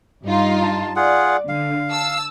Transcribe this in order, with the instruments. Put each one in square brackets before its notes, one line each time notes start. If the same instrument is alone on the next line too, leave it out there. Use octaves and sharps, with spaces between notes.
[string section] G2 D#4 F4
[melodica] A5
[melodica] F4 G#4 F#5 [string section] D5
[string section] D3 [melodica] F5
[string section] A5 E6